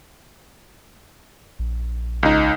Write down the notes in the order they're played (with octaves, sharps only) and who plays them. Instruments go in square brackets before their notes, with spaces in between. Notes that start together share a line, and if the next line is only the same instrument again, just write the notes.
[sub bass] A#1
[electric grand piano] C#2 D#4